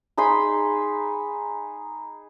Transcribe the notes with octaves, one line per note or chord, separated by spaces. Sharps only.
D#4 G#4 B5 C6